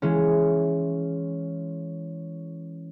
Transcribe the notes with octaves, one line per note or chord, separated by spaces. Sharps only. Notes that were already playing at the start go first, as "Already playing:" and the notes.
E3 G#3 C#4